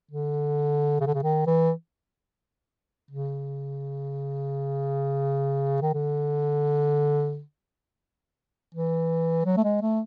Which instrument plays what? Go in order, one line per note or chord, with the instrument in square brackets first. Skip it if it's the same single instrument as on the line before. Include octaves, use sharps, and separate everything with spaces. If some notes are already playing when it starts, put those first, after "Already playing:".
[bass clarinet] D3
C#3
D3
C#3
D#3
E3
C#3
D#3
D3
E3
F#3
A3
G#3
A3